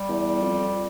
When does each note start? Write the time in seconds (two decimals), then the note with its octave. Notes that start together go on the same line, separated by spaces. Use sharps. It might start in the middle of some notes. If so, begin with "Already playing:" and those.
Already playing: G3
0.09 E2
0.42 F2